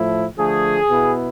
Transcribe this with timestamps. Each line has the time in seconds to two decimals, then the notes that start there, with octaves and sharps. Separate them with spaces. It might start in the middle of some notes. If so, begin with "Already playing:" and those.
Already playing: A2 F3 A3 E4
0.36 D3 F3 A3 G#4
0.89 B2 B3 E4